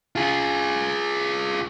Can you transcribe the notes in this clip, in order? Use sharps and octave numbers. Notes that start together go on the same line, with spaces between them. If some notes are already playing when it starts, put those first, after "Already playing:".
F4 G#4